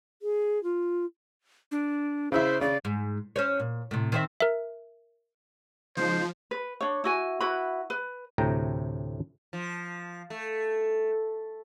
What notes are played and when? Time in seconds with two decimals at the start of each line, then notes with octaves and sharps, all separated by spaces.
0.22 G#4
0.63 F4
1.72 D4
2.32 C#3 E4 C5 E5
2.61 C#3 D5
2.85 G#2
3.36 C#4 C5 C#5
3.60 A#2
3.91 A2 C3
4.12 D#3 C4 E5
4.40 A#4 E5
5.97 C#3 F3 G#3 D#4 C5
6.51 B4
6.81 D4 C#5
7.04 E4 F#4 G#5
7.40 E4 F#4 B4 B5
7.90 B4
8.38 D2 A2 C3 G5 A#5
9.53 F3
10.30 A3